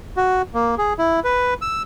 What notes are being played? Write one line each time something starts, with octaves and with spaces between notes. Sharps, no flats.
F#4
A#3
G#4
E4
B4
E6